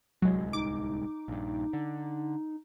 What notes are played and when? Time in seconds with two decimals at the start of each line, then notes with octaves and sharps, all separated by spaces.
0.22 D1 C2 F#3 G#3
0.53 D#4 D6
1.28 A#1 G2
1.73 D3